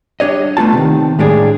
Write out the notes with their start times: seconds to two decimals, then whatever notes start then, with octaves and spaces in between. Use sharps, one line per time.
0.20 G3 D4 C#5 D#5
0.57 A3 B3 F4 A5
0.73 C3 D#3
1.19 A2 G3 G#3 D4 G4 G#4